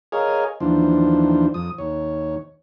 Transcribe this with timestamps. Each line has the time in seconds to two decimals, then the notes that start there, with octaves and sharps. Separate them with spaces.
0.12 G#4 A#4 C#5 D#5 F5 G#5
0.60 D#2 E3 F3 D4 C5
1.54 F2 D#6
1.78 D#2 C#5